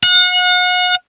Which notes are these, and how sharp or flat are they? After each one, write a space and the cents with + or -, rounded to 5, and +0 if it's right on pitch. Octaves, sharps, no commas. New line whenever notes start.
F#5 -35